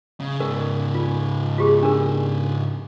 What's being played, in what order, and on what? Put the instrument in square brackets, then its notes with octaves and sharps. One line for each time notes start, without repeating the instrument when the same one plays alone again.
[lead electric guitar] C#3
[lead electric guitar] G#2 C#3 [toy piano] A#4
[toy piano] F4
F4 G4 G#4
D4 A#4